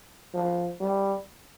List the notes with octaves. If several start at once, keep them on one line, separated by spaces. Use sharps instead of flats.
F3
G3